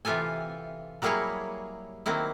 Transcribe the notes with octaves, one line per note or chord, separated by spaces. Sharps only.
C3 E3 F4 G4 A4 G#5
F#3 G3 A#3 E4 G#4 C#5
D#3 F#3 A#3 C4 E4